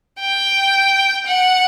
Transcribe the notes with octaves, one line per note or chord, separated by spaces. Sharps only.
G5
F#5